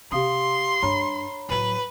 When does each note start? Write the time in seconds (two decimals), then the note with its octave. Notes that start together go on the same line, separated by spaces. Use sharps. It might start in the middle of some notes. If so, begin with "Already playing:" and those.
0.12 C3 G4 F5 C6 D#6
0.83 G2 C#5 A#5 B5
1.49 A2 F#3 B4